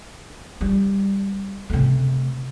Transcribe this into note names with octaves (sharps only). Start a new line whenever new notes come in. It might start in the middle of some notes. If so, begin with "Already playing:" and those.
G3
C3 A3